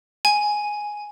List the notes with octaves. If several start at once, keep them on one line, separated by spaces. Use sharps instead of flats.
G#5